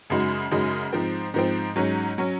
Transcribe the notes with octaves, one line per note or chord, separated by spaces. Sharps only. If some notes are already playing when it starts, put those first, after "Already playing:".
F#2 C#3 G#3 D#4 F#4
F#2 C#3 G#3 D#4 F#4
G#2 F3 C4
G#2 F3 C4
G#2 F#3 C#4
F#3 C#4